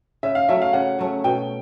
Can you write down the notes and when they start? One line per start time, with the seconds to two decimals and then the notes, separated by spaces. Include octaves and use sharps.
0.23 C#3 E5
0.35 F5
0.49 F#3 A3 C#4 E5
0.62 F5
0.73 C#3 F#5
0.99 F#3 A3 C#4
1.24 B2 G5